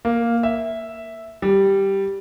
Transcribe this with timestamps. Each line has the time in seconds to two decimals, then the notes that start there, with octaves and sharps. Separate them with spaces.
0.05 A#3
0.43 E5
1.42 G3